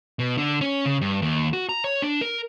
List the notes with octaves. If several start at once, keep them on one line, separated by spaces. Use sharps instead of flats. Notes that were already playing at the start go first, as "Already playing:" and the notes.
B2
D3
C#4
C#3
G2
D#2
F#4
A#5
C#5
D4
A#4